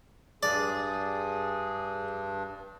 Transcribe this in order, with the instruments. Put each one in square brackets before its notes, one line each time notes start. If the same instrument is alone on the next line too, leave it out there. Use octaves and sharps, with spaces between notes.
[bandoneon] G2 D4 [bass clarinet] G#4 [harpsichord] D5